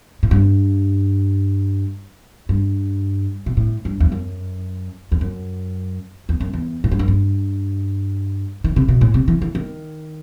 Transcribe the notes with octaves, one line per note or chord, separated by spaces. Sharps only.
A2
G2
G2
B2
A2
G2
E2
F#2
E2
F#2
E2
F#2
E2
A2
G2
F#2
G2
D#3
C3
B2
A2
C3
E3
E3
D#3